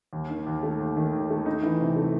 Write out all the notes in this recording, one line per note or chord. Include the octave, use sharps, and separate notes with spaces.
D#2
D#3
D#2
A3
D#2
D#3
D#2
A3
D#4
E3
C3
A3